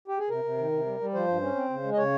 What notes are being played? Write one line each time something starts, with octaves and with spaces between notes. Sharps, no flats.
G4
G#4
C3 A#4
C3
D#3
C3
G3
G3
F3 C5
G2
C#4
C4
C#3
G#3
D#5
C#3 C#5